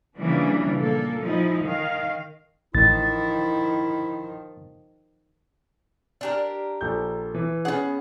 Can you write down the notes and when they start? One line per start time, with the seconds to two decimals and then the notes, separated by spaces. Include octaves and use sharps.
0.18 C#3 E3 F3 G3 A#3 D4
0.78 A#2 A#3 A4
1.21 F3 G#3 D#4 E4
1.63 D#3 F5
2.75 A1 D#3 F3 E4 A6
6.21 D4 G4 A#4
6.81 A#1 A4 G6
7.34 E3
7.65 B3 C#4 G#4 F#5